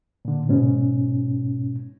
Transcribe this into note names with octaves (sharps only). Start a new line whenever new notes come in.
A#2 D3
G#2 B2 C#4